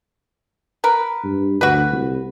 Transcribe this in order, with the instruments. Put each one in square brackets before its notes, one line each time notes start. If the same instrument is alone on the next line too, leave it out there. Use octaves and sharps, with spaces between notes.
[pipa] A#4 B4
[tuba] G2
[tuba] D2 [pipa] F#4 B4
[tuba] C2